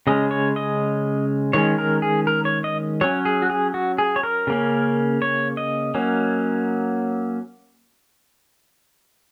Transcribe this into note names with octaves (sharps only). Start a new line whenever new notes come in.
C#3 G#3 C#4 D#5
C#5
D#5
D#3 G#3 C#4 C#5
A#4
G#4
A#4
C#5
D#5
F#3 C#4 C#5
G#4
F#4
G#4
F#4
G#4
C#5
A#4
C#3 A#3 C#4
C#5
D#5
F#3 A#3 C#4